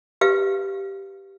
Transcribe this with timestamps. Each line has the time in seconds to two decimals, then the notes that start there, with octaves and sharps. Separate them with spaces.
0.21 G4 B4 F5